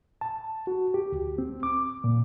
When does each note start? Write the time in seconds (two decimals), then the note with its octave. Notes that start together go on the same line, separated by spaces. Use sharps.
0.21 A5
0.67 F#4
0.94 G4
1.12 D2
1.38 C4
1.63 D6
2.04 A#2